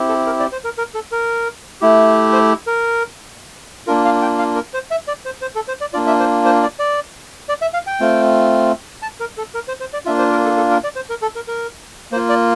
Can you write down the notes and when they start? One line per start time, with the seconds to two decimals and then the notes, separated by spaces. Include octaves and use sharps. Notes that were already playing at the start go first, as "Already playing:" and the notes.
Already playing: C4 E4 G4
0.09 A4
0.26 A#4
0.40 D5
0.52 C5
0.64 A#4
0.78 A#4
0.94 A4
1.12 A#4
1.81 A3 E4 G4
2.33 C5
2.67 A#4
3.87 A#3 D4 F4 A#4
4.05 F5
4.22 G5
4.39 F5
4.55 A#4
4.74 C5
4.91 E5
5.08 D5
5.25 C5
5.42 C5
5.55 A4
5.68 C5
5.81 D5
5.93 A#3 D4 F4 D5
6.07 E5
6.20 C5
6.45 C5
6.62 D5
6.79 D5
7.49 D5
7.62 E5
7.74 F5
7.87 G5
8.00 A3 C4 F4
9.02 A5
9.20 A#4
9.38 A4
9.54 A#4
9.68 C5
9.80 C5
9.93 D5
10.05 A#3 D4 F4 E5
10.18 C5
10.32 A#4
10.45 A4
10.57 A4
10.71 A#4
10.84 D5
10.96 C5
11.10 A#4
11.22 A4
11.36 A#4
11.48 A#4
12.12 A#3 C5
12.16 F4
12.29 D5